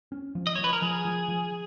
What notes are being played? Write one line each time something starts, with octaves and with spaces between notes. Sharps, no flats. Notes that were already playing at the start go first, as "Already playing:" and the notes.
C#4
F3
D#5
F3 C#5
B4
A#4
F3 G#4
F3
F3